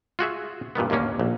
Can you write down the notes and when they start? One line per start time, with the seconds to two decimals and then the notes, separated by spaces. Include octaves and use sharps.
0.19 F4 F#4 G#4 E5
0.75 G2 A#2 D#3 B3
0.90 D#2 A2 D3 A#3 C#4
1.19 A#1